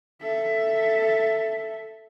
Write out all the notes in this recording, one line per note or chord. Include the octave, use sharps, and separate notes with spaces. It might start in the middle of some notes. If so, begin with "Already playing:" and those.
A4 E5